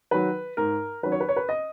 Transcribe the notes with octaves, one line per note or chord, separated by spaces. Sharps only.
D#3 F#3 B4
G#2 A#4
D#3 F#3 C#4 B4
C#5
B4
C#5
B4
D#5